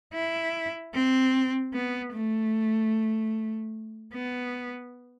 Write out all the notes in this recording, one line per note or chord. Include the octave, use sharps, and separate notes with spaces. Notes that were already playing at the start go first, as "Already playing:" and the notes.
E4
C4
B3
A3
B3